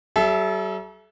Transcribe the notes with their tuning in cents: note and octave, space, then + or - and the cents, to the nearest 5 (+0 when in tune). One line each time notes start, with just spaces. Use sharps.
G3 -45 A4 -35 E5 +5